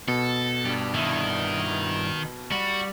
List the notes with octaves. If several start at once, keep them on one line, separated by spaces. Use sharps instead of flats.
B2 A4
G2 G4
G2 D#3 E4
G3 F#4